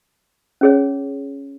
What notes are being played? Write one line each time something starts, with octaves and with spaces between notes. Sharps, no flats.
C#4 G#4 C#5